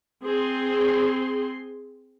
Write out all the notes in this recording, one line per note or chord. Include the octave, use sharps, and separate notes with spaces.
C4 G#4 C6